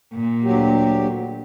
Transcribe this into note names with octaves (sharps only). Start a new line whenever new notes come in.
A#2
D2 F#3 G4